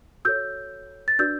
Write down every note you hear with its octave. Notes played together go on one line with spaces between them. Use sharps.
F#4 A4 C#5 E6 G6
A6
D4 F#4 B4 D5 E6 G6